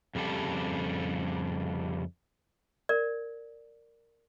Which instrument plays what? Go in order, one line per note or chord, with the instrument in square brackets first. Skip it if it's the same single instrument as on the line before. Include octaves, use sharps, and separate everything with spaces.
[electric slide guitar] F2 C#3 G3 G4 A4
[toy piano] A#4 D5